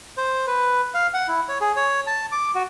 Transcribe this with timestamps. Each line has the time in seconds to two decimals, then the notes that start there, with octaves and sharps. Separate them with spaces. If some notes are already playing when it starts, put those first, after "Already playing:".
0.17 C5
0.47 B4
0.94 F5
1.14 F#5
1.28 E4
1.49 C#5
1.61 G#4
1.76 C#5
2.07 A5
2.32 D6
2.55 F#4